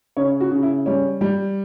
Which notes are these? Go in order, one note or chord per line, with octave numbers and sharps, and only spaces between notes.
C#3 C#5
F#4
C#3
E4
G3 C#4
G3